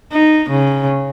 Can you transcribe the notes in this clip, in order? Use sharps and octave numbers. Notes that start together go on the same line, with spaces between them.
D#4
C#3